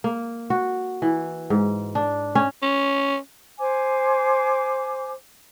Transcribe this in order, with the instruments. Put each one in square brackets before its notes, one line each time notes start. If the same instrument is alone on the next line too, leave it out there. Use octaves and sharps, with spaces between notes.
[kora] A#3
F#4
E3
G#2
D4
C#4
[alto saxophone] C#4
[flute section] C5 G#5 D6